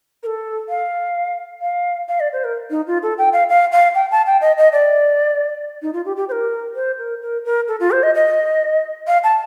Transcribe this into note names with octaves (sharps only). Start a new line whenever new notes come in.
A#4
A4
F5
F5
F5
D5
C5
A#4
D#4
F4
A4
G5
F5
F5
F5
G5
A5
G5
D#5
D#5
D5
D#4
F4
G4
G4
C5
A#4
C5
A#4
A#4
A#4
A4
F4
C5
D#5
D#5
F5
A5